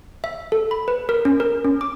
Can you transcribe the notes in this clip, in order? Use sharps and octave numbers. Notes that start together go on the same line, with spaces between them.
E5
A4
B5
B4
A#4
C#4
A#4
C#4
D6